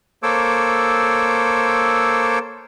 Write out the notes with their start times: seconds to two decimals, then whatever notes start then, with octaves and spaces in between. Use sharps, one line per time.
0.23 A#3 A4 C5 C#5 D6 E6